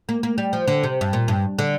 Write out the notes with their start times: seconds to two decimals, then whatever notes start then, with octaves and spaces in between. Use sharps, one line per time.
0.09 A#3
0.23 A#3
0.38 G3
0.53 F3
0.68 D3
0.83 C3
1.01 G2
1.13 A#2
1.28 G2
1.59 D3